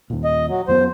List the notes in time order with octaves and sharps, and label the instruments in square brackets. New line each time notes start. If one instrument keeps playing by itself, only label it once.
[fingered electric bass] D#2 A#2
[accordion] D#5
F#3
[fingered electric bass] F#2 F#3 B3 [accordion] C5